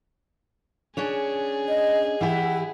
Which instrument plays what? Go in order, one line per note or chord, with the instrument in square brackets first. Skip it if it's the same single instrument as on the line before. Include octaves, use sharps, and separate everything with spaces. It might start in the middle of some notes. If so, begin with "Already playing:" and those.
[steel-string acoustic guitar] C#4 D4 C#5 [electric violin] G#4
[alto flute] D#5
[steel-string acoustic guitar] E3 E4 G4 [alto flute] F#5